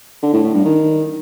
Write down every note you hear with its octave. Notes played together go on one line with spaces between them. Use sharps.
D3
A2
A2
G2
D#3